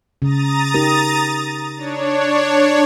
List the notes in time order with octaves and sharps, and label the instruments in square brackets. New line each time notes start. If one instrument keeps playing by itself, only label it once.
[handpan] C#3 [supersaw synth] A#5 D#6 A6
[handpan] D#4 G4 A#4
[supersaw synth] D4 C#5